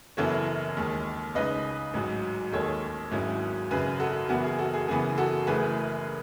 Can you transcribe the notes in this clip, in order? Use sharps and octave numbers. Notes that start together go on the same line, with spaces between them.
F#1 F#2 E3 B3 E4 A4 C#5
D#2 D#3 G#3
C#2 C#3 G#3 D#4 B4 D#5
A1 G#2 F#3
D#2 D#3 G#3 A4 C#5
G#1 G#2 F#3 C#4 E4
G#1 F#2 C#3 G#4 B4
F#4 A4
F#1 F#2 E3 B3 E4 F#4
G#4
F#4 A4
G#4
F#1 F#2 C#3 E3 B3 G#4
F#4 A4
F#1 F#2 E3 A3 G#4 B4